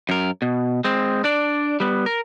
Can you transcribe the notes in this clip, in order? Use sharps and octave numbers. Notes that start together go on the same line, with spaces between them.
F#2 A#4
B2
G#3 C4
D4 D5
G3 B3
A#4